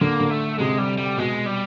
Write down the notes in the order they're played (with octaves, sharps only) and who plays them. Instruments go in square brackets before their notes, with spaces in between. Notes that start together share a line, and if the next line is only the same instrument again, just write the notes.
[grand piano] D3 [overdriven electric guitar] A#3
[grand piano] D3
[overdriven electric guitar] A3
[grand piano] C3 [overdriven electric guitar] G#3
[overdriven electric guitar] G3
G3
[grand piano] B2 [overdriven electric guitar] G#3
[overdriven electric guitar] G3